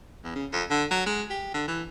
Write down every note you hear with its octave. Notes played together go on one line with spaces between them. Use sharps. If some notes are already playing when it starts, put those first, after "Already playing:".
E2
C#3
F2
D3
F#3
G#3
G4
D3
E3